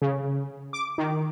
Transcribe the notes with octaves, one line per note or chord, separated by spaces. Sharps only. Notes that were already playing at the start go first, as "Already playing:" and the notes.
C#3
D6
D#3